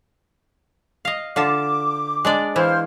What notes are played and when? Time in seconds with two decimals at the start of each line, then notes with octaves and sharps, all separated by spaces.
1.05 D#5 F5
1.36 D3 F4 A5 D6
2.25 G#3 D4 D5
2.56 E3 E4 C5 F5 F6